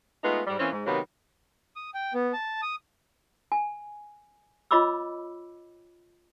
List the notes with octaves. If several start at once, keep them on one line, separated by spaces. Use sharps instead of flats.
G#3 A3 B3 D#4 F4
G#2 G3
E3 A#3 C4 C#4
G#2
C3 D#3 F#3 A#3 B3
D#6
G5
B3
A5
D#6
G#5
F4 C#5 D#5 B5 D6 E6